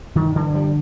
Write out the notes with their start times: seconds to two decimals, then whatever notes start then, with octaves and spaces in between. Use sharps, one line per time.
0.15 G2 D#3
0.36 D3 E3
0.54 D3 F3 G3